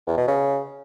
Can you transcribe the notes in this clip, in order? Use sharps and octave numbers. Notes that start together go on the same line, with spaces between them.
E2
B2
C#3